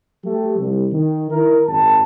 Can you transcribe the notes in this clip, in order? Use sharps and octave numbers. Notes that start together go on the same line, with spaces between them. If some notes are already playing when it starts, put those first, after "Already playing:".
F#3 A3 G4
C2
D#3
D#3 E4 A#4
G#1 F#2 A5